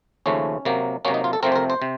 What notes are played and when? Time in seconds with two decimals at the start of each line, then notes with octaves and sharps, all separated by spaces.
0.26 D#2 C#3 F3 A3 C#4
0.65 C3 F#3 A#3
1.05 C3 F#3 A#3 C#4
1.14 D#4
1.24 F4
1.33 A4
1.43 C3 F3 A3 C4 A#4
1.52 C5
1.56 A#4
1.70 C5
1.82 C3